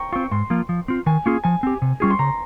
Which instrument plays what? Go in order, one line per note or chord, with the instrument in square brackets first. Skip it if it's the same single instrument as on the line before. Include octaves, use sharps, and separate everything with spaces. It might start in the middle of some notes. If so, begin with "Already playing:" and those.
Already playing: [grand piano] G5 A#5 C#6
[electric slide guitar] C4 F4 [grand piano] C#6
[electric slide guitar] G#2 [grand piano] C6
[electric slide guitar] F3 A#3 F4
F3
C4 F4
[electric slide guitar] D#3 [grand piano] G#5
[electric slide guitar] A#3 C#4 F4 G#4
[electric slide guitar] F3 [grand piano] G#5
[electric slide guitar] C4 G4
C3
[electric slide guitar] G3 C#4 F4 G#4 [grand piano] C#6
[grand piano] C6
[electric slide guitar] C#3 [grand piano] A#5